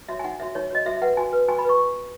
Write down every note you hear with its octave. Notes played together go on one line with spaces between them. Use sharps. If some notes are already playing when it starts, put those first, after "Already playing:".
F#4 C#5 E5
G#5
D#4 F#5
F#4 C#5 E5
D#4 C#5
F#4 C#5 D#5
F#4 E5
E5
B4 F#5
F#4 G#5
B4
F#4 G#5
B5
B4 C#6